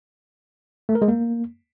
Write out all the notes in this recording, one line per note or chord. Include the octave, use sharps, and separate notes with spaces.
A3
A#4
G#3
A#3